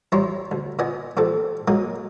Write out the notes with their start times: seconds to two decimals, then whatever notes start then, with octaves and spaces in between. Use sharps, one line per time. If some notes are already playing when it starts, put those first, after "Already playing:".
0.12 A1 G3 E4 C#5 A#5 C6
0.51 D2
0.79 A#2 B3 D#5 G#5
1.17 A1 A#2 C4 A4
1.68 F#3 G#3 A#3 D#6